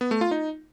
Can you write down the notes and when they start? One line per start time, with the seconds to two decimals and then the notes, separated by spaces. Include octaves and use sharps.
0.01 B3
0.11 A3
0.21 F4
0.31 D#4